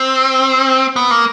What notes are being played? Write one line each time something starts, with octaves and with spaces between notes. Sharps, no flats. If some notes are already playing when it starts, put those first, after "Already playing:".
Already playing: C4
B3
A#3